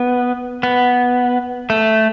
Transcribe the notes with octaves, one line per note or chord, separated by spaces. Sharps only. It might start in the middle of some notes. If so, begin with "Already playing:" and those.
Already playing: B3
B3
A3